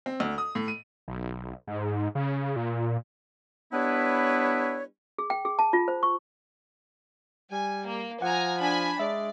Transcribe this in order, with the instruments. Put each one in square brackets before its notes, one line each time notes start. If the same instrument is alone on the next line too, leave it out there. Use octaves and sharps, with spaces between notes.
[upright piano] C4
D2
D#6
A2
D#7
[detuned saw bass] B1
G#2
C#3
A#2
[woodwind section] G3 B3 D4 E4 B4 C#5
[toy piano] G#4
G5
G#4
A5
F4
C5
C#6
[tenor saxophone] G3 [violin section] G#5
[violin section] A#3
[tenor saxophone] F3 [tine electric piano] F#5 [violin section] G#5 A#5
[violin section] D4 G#5 B5
[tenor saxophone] G#3 [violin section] D5 [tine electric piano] E5